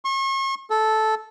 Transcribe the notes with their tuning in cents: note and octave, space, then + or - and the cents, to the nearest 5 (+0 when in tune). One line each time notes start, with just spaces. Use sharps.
C#6 -40
A4 -10